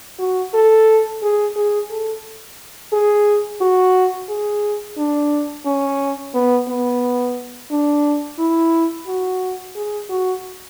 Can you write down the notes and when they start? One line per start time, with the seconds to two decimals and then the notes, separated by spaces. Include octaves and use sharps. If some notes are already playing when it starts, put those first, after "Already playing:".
0.19 F#4
0.54 A4
1.22 G#4
1.56 G#4
1.91 A4
2.93 G#4
3.61 F#4
4.29 G#4
4.98 D4
5.66 C#4
6.34 B3
6.68 B3
7.71 D4
8.39 E4
9.07 F#4
9.75 G#4
10.09 F#4